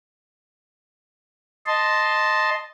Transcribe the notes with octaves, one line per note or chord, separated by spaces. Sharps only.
D#5 A5 C6